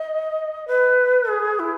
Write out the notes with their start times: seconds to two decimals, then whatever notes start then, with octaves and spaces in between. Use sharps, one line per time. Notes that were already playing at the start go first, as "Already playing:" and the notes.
Already playing: D#5
0.68 B4
1.29 G#4
1.59 E4